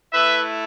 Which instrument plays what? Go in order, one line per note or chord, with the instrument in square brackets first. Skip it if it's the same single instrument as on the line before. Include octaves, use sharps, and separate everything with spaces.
[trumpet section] A3 E4 B4 E5